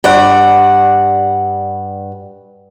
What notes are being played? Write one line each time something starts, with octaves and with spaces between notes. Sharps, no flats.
G2 D5 F#5